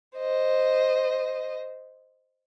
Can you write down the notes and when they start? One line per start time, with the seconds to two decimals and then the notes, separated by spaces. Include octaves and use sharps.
0.17 C5 D#5